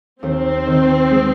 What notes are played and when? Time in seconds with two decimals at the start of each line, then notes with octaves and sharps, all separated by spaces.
0.22 D#2 C4
0.67 D#3
1.11 G#3